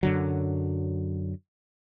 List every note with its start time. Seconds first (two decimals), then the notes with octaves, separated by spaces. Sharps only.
0.03 F#2 D3 F#3